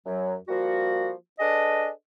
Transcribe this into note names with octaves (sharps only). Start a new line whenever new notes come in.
F#2 F#3
F3 G3 A#3 F#4
D4 G#4 A4 B4 D#5